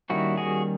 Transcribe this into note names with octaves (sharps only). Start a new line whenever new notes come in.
D#3 G3 A#3 C#4 E4 F#4
F#4 G#4